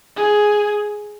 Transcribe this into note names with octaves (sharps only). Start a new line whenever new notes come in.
G#4